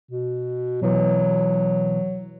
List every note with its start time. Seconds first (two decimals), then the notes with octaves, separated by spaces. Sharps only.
0.12 B2
0.82 B2 E3 F#3